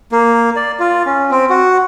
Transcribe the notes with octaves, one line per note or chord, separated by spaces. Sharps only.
A#3
D5
F4
C#4
C4
F#4